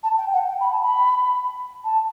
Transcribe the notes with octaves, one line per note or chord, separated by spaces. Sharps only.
A5
G5
F#5
G5
B5
A5
B5
A5